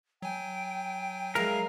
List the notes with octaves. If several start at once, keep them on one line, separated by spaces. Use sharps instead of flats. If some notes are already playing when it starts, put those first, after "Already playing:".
F#3 G5 G#5
G#3 E4 A#4 F5